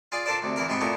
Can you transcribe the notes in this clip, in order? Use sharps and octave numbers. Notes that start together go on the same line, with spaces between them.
F4 G#4 D5 G#5
D4 F4 A4 A#4 C5 D5
D2 C3
E2 E3 E4 A#4 A#5
G#2 C3 B3 G#4 G5
A#2 A3 B3 E4 A#5